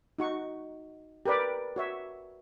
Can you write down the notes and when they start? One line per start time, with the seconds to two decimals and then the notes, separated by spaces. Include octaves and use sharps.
0.18 D#4 F#4 C#6
1.26 G4 A#4 B4 D5
1.76 F#4 C#5 E5